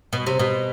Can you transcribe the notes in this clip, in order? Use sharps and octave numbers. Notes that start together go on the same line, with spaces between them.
B2
C3
B2